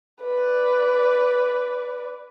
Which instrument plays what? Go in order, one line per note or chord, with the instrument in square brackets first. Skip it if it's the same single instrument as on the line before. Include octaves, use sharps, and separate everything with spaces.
[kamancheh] B4 D5